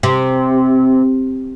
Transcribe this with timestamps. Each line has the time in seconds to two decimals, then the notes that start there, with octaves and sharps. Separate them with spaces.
0.03 C3